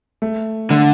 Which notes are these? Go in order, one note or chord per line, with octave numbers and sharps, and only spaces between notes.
A3
D3 A3